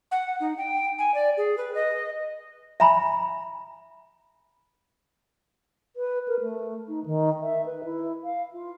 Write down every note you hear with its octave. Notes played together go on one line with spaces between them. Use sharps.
F#5
D#4
G5
G#5
D5
G#4
B4
D#5
E5 G#5 A#5 B5
B4
A#4
A3
D#4
D#3
E5
B4
E4
F5
F4